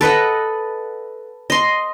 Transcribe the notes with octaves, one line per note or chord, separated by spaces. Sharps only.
A4 B4 D#5 F#5
D#5 C6